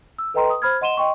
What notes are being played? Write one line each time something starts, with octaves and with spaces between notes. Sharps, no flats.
E6
A4 B4 D#5 G5 A#5 C6
D#6
C5 B5 F6 G#6
D#5 F#5 C6 D#7 E7 G7
D#5 G5 C6 C#6